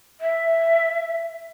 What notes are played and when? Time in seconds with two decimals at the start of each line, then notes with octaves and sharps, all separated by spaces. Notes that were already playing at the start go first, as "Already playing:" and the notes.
0.21 E5